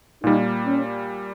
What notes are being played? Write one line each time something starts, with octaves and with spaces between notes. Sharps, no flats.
A#2 G3 A#3 D#4
C#4